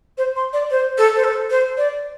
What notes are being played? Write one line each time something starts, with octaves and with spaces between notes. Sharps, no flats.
C5
C6
D5
C5
A4
C5
A4
C5
D5